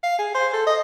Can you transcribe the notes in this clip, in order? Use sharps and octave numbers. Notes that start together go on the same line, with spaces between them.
F5
G#4
C5
A4
D#5